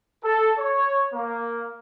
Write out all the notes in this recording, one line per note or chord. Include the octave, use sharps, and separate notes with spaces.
A4
C#5
A#3